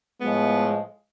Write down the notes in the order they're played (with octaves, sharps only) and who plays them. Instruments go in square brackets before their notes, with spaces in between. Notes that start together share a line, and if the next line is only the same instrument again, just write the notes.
[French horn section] A2 F3 G#3 [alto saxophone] B3